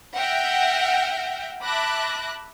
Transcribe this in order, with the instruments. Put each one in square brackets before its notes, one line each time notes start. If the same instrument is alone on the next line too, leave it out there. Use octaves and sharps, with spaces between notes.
[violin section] E5 F#5 G5 F6 G6 A#6
E5 A5 B5 D6 F#6 A#6